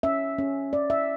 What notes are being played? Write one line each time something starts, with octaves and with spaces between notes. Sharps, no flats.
C#4 E5
C#4
C#4 D5
E5